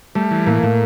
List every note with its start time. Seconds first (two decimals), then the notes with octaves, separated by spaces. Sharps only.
0.15 G3 A3
0.31 E3
0.46 A2 A#3
0.63 A2